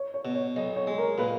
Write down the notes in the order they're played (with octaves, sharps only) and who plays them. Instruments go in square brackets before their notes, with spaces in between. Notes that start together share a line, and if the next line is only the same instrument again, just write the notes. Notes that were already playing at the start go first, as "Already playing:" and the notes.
Already playing: [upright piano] C#5
C#5
[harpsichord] B2
[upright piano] C#5
[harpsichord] B1 [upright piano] D#5
[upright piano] C#5
[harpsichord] G#3
[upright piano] A#4
[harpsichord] A#2 [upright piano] B4